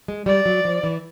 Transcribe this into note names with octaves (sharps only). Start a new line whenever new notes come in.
G#3
G3 D5
F#3
F3
E3